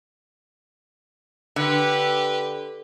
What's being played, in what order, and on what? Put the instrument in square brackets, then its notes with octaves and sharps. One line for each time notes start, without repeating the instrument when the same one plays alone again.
[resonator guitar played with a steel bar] D3 [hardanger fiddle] G4 B4